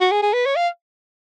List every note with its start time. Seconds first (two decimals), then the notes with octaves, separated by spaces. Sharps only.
0.01 F#4
0.11 G#4
0.22 G#4
0.34 B4
0.46 C#5
0.56 F5